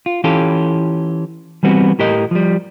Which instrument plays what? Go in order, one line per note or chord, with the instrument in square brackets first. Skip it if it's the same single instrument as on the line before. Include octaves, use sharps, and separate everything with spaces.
[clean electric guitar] F4
E3 C#4 F4 G4 A4
E3 G3 B3 C4 D4 F#4
A2 G4 A#4 D#5
F3 G3